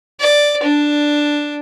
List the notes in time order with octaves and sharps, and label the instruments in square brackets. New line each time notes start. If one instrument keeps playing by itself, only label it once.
[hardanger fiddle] D5
D4